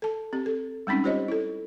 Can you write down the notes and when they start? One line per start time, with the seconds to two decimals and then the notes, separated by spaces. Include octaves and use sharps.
0.02 A4 A5
0.33 C4 G4
0.46 A4
0.87 G3 G#3 C4 C#4 D#4
1.04 F4 G4 C5 C#5 D#5
1.28 E4 A4